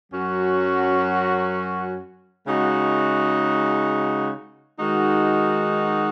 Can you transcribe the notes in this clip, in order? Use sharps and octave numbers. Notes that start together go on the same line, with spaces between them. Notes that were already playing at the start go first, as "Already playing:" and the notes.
F#2 F#3 C#4 F#4
C#3 G#3 D#4 F#4
D#3 G#3 D#4 F#4